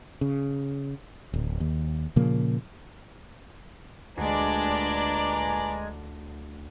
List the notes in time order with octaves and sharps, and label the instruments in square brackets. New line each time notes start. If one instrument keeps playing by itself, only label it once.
[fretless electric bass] C#3
D1
D#2
A#2 C#3 F3 A#3
[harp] D2 [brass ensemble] A#2 B4 A#5 [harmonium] G#3 G#5 [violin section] D4 D5